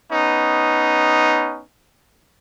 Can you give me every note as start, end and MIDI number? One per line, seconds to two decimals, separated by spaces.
0.11 1.62 59
0.11 1.62 61
0.11 1.62 63